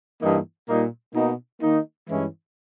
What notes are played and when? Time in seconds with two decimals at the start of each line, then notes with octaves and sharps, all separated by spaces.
0.21 G2 E3 A#3 D#4
0.68 A#2 G3 A#3 D#4
1.15 B2 A#3 D#4
1.61 D#3 A#3 D#4
2.08 G2 E3 G#3 C#4 E4